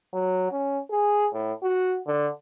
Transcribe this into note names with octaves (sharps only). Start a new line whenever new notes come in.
F#3
C#4
G#4
A2
F#4
D3